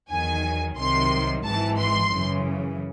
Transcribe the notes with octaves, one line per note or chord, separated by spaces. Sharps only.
E2 D#3 F#3 G#5
C2 C3 D#3 F#3 C6
G#1 G#2 E3 A5
C6
F#2 C#3 E3